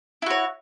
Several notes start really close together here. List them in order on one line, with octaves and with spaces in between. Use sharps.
E4 F#4 C#5